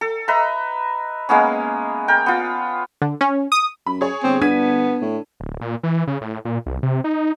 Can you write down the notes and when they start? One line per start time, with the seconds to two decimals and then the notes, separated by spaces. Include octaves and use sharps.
0.01 A4
0.28 B4 D#5 E5 A#5
1.29 G#3 A#3 B3 C#4
2.08 A#4 G5
2.26 B3 F4
3.02 D3
3.21 C#4
3.52 D#6
3.87 F#2 B5
4.01 G#4 C#5
4.23 G1 C4
4.42 B3 D4 G#6 B6 D#7
5.01 A2
5.40 D1
5.61 A#2
5.83 E3
6.07 C#3
6.21 A2
6.45 A#2
6.66 C2
6.83 C3
7.04 D#4